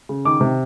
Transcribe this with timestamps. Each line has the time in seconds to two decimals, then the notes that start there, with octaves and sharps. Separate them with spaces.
0.09 C#3
0.25 D#3 D6
0.41 C3